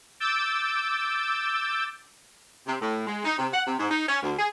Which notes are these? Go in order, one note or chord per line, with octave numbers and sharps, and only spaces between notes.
D6 E6 G6 A6 D7
C3
A2
G#3
D#4
C3
F#5
C3
G#2
D#4
C#4
D2
G#4